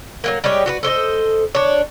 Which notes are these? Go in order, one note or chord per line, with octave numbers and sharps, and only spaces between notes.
F#3 G#3 A#3
G3 G#3 G4 C#5
F#4 G4 B4
A4 C5 C#5 D#5
D4 C#5